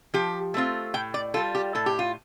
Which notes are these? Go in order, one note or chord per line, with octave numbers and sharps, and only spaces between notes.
F3 G4
A3 C4 F4
A2 G5
D5
G3 F4 A4
G4
A2 A4
G4
F4